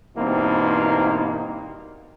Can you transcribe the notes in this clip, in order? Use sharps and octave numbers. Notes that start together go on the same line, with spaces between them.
G2 B2 E3 A#3 C4 D#4